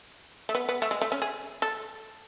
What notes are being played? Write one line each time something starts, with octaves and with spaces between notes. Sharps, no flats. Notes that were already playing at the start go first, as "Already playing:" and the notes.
A3
B3
B3
A3
G#3
A3
C#4
G#4
A4